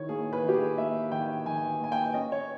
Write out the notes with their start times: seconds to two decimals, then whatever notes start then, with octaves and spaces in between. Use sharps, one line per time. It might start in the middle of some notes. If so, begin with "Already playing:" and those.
Already playing: D#3 E4 C#5
0.09 A#3 G#4
0.33 B4
0.43 D#3
0.49 G4
0.55 G#4
0.78 A#3 E5
1.12 D#3 G5
1.46 D#3 G#5
1.81 A#3 G#5
1.92 G5
2.14 C#4 D#5
2.32 C#5